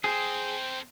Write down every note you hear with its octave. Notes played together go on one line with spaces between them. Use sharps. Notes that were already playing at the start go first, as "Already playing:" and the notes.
C4 G#4 A4 C5 G5